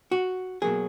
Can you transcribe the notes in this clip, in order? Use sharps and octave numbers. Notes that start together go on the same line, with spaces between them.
F#4
B2 F#3 A#3 G#4